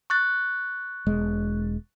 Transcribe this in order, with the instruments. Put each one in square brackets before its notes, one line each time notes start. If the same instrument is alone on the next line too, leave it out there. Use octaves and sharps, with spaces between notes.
[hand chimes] C#6 F#6 A6
[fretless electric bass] E1 G#3